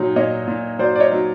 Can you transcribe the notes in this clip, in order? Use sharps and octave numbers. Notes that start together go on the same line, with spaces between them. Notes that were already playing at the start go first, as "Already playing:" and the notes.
Already playing: A#2 F#3 D#4
A#2 C#5 D#5
A#2
F#3 C5 D5
D5
C#5 D#5
F#3